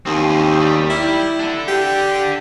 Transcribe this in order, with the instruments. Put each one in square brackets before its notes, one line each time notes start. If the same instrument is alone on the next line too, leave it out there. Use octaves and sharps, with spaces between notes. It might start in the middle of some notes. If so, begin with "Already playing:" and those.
[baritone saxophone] D#2 [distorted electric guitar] C4 C#4
[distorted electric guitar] G3 G4
[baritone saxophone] E4
[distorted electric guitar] D4 A4
[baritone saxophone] G4